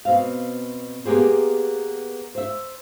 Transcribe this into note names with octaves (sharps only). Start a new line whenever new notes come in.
B2 C4 F5
A#3 B3 G4 G#4 C5
C5 E5